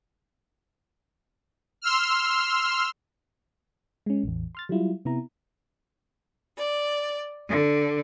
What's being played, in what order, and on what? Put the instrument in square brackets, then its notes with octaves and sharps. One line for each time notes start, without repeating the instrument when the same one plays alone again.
[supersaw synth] C6 E6 F6
[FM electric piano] G#3 C#4
A1 E2
C6 F6 A6
F#3 G3 E4 F4
C3 B3 E4 A#5
[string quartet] D5
D3